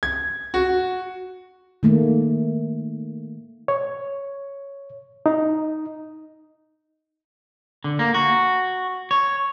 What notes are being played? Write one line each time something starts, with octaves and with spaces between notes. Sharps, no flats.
G#6
F#4
D#3 A3 A#3
C#5
D#4
D3
A#3
F#4
C#5